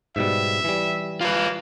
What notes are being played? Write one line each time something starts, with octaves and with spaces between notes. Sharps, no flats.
G#2 B2 G3 E5
E3 G3
A#3 F4 B4